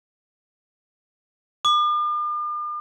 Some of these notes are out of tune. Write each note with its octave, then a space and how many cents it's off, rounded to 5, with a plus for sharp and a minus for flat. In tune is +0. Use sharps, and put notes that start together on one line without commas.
D6 +45